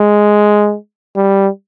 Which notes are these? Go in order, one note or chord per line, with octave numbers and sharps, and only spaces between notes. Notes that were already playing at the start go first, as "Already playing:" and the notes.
Already playing: G#3
G3